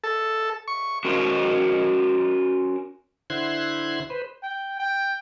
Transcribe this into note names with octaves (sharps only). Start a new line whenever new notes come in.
A4
C#6
C#4 F#4 A#4 C5
D3 E4 C5 C6 F#6 G#6
B4 C5
G5
G5